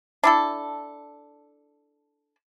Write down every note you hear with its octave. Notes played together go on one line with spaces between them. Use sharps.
D4 E4 A4